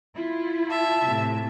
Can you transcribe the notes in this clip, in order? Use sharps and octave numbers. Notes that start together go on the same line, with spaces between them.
E4 F4
E5 A5
A2 C3